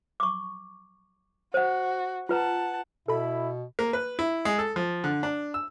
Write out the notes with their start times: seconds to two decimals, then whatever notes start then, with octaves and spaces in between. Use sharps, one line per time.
0.20 C#6 D6
1.54 F#4 C5 F#5
2.29 F4 B4 F#5 A5 A#5
3.08 B2 E4 A4 B5
3.79 A#3
3.93 B4
4.19 E4
4.45 G#3
4.59 A4
4.76 F3
5.04 D3
5.23 D4
5.54 E6